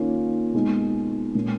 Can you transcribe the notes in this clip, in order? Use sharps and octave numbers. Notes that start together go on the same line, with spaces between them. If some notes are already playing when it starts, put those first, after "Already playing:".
Already playing: D#3 A#3 C#4 F4
B2 G#3 D#4
A#2 G#3 C#4